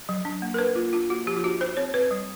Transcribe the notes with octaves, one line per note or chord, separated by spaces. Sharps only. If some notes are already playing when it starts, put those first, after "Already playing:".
F#3
D4
A#3
A#4
D4 B4
A#3 F4
D4 F4
A#3 F#4
F3 G4
F4
D4 F#4
D#4 C5
C4 C#5
C4 B4
G3